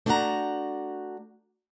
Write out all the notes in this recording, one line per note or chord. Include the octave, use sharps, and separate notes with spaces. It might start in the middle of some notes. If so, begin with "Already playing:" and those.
A3 D4 E4 F#4 F#5 A#5